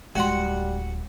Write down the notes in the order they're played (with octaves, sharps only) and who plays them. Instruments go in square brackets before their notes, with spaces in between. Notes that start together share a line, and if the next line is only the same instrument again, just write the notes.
[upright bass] D1 [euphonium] G3 [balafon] G#3 C6 [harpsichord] F#4 F#5